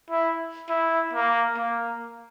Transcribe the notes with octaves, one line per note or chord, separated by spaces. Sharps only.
E4
E4
A#3
A#3